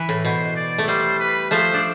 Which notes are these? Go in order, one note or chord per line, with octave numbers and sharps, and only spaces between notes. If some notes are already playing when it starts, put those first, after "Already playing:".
Already playing: E3 B4
A2
B2 C5
D5
A3
G3 C5
B4
F3 A3 C5
D4